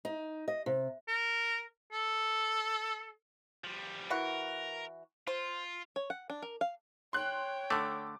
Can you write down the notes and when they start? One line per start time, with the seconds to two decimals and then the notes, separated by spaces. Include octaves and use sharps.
0.05 D#4
0.48 D#5
0.66 C3
1.08 A#4
1.92 A4
3.64 F3 G3
4.10 E3 F#4 A#4
5.27 F4 C5
5.96 C#5
6.10 F#5
6.30 D4
6.42 A#4
6.61 F5
7.13 C#5 G5 C6 F#6
7.70 D3 A3 D6